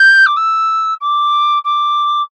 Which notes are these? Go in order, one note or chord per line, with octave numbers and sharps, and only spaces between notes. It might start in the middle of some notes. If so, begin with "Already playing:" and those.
Already playing: G6
D6
E6
D6
D6